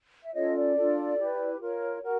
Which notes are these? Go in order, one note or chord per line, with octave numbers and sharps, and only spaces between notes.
E5
C#4 F4 A4 C#5 D#5
D5
D4 F4 A4
E4 G4 B4
F4 A#4 C#5
F#4 A#4